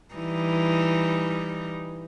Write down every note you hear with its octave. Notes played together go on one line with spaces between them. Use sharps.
E3 G3 D#4